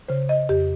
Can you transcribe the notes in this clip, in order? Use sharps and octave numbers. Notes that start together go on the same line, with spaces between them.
C#3 C5
D#5
F2 G4